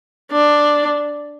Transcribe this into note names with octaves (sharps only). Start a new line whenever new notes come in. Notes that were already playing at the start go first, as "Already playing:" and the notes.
D4